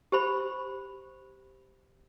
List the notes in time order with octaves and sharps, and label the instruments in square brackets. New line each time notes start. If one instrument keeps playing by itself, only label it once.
[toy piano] G4 C5 B5